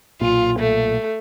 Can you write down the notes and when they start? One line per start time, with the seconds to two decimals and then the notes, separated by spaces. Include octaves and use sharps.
0.21 B1 A#2 F4
0.60 A3